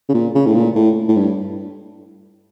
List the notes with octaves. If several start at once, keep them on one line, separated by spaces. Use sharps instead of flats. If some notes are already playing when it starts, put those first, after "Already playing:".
C#3
A#2
C#3
A2
A#2
A2
A2
G2